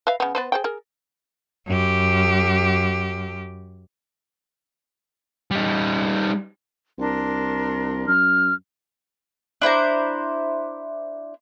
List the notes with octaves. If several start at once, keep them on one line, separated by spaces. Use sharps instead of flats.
B4 E5 F5
C#3 B3
B3 B4 C5
G#4 C5 G5
G#4 A#4
F#2 G4
G3 D#4
C2 D4 A#4 C6
F#2 F6
D4 E4 C5 A#5